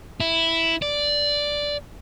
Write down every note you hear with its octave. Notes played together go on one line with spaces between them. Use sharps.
E4
D5